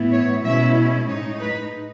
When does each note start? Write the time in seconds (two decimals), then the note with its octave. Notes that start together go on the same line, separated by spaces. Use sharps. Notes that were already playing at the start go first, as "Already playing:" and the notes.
Already playing: A2 E3 B3 E4
0.12 C#5
0.44 B2 G#3 C#4 E4 E5
1.08 A2 G#3 D#4 C#5
1.40 B4